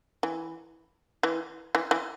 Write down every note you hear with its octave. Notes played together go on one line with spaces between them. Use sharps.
E3
E3
E3
E3